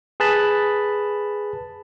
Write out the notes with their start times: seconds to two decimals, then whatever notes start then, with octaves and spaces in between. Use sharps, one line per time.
0.20 G#4 B4 A5 B5